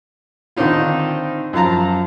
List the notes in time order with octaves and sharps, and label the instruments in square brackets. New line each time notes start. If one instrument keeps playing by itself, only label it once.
[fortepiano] D3 D#3 C4 D4 D#4 F4
F#2 F3 F5 A5 A#5